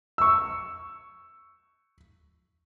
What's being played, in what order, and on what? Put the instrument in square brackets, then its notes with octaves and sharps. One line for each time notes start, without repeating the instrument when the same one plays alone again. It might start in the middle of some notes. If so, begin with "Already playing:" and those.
[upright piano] C#6 E6